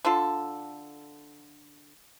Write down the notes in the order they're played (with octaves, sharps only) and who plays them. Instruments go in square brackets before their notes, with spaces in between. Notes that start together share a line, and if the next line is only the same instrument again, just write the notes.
[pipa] D3 D4 F4 A4